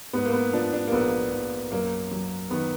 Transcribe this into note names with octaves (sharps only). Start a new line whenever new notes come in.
G#2 B3
A#3
B3
F3 D4
D4
A#3
A#1 B3
A#1
F#2 A#3
F#3
D#3 B3